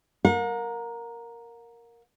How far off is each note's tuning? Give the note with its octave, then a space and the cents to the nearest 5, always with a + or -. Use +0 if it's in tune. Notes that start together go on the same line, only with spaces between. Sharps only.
A#4 +0 F#5 -45